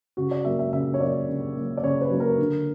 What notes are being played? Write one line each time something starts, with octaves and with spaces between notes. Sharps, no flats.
C#3 F#4
D5
F#3 A#3 E5
E5
C#3 E5
C#5
F#3 A#3 D5
C#3
F#3 A#3
D5
C#3 C#5
B4
F#3 A#3
A#4
D3